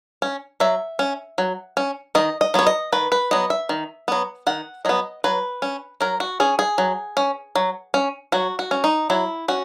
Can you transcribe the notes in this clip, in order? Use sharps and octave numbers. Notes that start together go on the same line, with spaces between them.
C#4
F#3 E5
C#4
F#3
C#4
D#3 D#5
D#5
F#3 B3 C#5
D#5
D#3 B4
B4
F#3 B3 D#5
E5
D#3
F#3 B3
D#3 F#5
F#3 B3 D#5
F#3 B4
C#4
F#3 A#4
F#4
C#4 G#4
G#4
F#3
C#4
F#3
C#4
F#3 F#4
F#4
C#4
D#4
F#3 E4
C#4 F#4